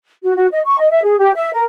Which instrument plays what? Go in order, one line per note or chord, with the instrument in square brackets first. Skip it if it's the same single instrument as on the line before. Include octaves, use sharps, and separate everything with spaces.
[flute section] F#4
F#4
D#5
C#6
D#5
E5
G#4
G4
E5
A#4